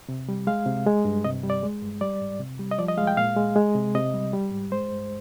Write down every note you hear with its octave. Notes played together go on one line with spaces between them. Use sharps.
C3
G3
G#3 F5
C3
G#3
G2
C3 D#5
G3
D5
G#3
G2
G3 D5
G#2
C3
G3
D#5
F3 D5
D#5
G#3 F5
G5
A#2 F5
G#3
G#3
C3
C3 D#5
G3
G3
G#2
G#3 C5
G2